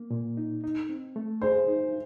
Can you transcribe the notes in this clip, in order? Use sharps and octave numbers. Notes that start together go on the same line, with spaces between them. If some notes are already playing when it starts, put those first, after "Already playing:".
Already playing: A#3
A#2
D#4
D#4
C4
A3
G#4 C5
D#4